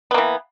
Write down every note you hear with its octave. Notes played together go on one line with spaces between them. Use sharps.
E3 A#3 B3